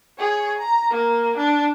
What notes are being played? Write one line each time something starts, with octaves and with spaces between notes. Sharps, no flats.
G#4 C#5
A#5
A#3
D4